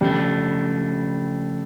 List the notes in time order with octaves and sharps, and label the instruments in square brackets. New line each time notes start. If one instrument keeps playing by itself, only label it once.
[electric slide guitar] C#3 F3 A3 D4 [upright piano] G3